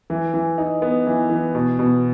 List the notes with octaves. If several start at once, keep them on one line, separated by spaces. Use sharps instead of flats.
E3
E3
D#4
B3
E3
E3
B2
B2